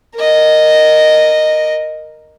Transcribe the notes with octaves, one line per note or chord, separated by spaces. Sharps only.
A#4 D#5